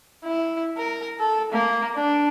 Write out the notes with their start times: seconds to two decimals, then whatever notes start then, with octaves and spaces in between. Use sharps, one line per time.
0.25 E4
0.77 A#4
1.19 A4
1.53 A#3
1.96 D4